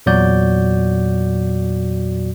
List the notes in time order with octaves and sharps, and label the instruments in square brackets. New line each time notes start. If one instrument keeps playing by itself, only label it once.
[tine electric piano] E2 A#2 F#3 F#4 D5 G6